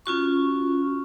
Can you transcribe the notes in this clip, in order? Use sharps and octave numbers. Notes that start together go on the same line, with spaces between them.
C#4 F4 F#4 C#6